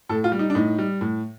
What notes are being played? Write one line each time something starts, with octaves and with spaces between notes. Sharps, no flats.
A2 A4
F4
G3
D#4
D4
A2 D#4
G3
A2